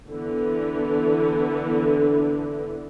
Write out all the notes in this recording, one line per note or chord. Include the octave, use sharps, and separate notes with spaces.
D3 E3 B3